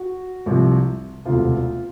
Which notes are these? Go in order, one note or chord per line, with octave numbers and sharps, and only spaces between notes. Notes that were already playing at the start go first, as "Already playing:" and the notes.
Already playing: F#4
C2 C3 F3
E1 D2 C3 F4